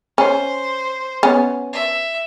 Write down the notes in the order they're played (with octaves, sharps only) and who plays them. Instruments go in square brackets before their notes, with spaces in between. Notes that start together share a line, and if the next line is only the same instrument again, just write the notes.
[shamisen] C#4 [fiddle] C5
[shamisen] B3 C#4
[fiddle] E5